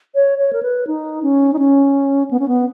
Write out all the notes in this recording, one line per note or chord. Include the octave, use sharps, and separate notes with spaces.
C#5
C#5
A#4
B4
D#4
C#4
D#4
C#4
B3
C#4
B3